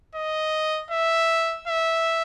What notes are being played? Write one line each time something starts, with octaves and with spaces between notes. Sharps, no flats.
D#5
E5
E5